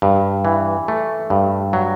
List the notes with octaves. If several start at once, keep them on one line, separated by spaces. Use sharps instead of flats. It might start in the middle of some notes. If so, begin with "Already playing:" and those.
G2
E3
A3
G2
F#3